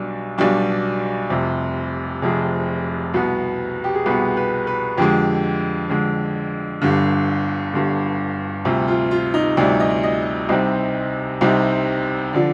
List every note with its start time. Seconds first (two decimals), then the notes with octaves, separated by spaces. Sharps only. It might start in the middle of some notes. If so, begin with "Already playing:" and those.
Already playing: B1 B2 G3 D4
0.38 B1 B2 G3 D4
1.30 F1 F2 C3
2.22 F1 F2 C3 G#4
3.14 C2 B2 B3
3.84 G4
3.95 G#4
4.06 C2 B2 B3 B4
4.37 B4
4.67 B4
4.97 F2 D3 G#3 G4
5.90 F2 D3 G#3
6.82 G1 G2 D3
7.73 G1 G2 D3
8.65 D2 C3 G3 F4
8.88 F4
9.11 F4
9.34 D#4
9.57 D2 C3 G3 D5
9.80 D#5
10.03 D#5
10.49 C2 C3 G3 C4 D#4 D#5
11.41 C2 C3 G3 C4 D#4
12.33 D3 F3 D5